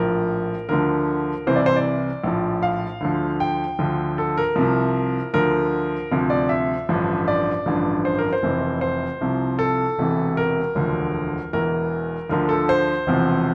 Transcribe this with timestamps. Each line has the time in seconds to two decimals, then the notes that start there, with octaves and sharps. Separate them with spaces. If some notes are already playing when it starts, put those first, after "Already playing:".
Already playing: A#1 A2 F3 A#4
0.69 D2 D3 F3 A#4
1.47 C2 C3 E3 C5
1.56 D5
1.66 C5
1.76 D5
2.24 A#1 A2 F3
2.63 F5
3.01 D2 D3 F3
3.40 G5
3.79 D2 D3 F3
4.18 A4
4.37 A#4
4.56 C2 C3 F3
5.34 D2 D3 F3 A#4
6.11 D2 C3 F3
6.30 D5
6.49 E5
6.89 A1 G2 D3 F3
7.28 D5
7.66 A1 G2 D3 F3
8.05 C5
8.19 A#4
8.33 C5
8.43 F1 F2 C3 E3
8.81 C5
9.21 C2 C3 F3
9.59 A4
9.98 E1 E2 C3 E3
10.37 A#4
10.75 E1 D2 D3 F3
11.53 E1 E2 E3 A#4
12.30 D2 D3 F3 A#4
12.49 A4
12.69 C5
13.07 E1 E2 C3 F3